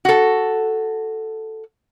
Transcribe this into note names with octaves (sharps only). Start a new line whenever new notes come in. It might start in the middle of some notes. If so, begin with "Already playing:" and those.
F#4 A4